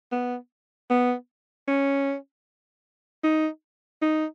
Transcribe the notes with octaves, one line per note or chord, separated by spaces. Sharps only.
B3
B3
C#4
D#4
D#4